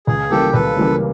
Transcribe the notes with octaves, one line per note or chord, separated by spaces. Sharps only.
C#2 G#4
C#3 E3 G3 A#3 G4 A4
C#2 A4 B4
C#3 E3 G3 A#3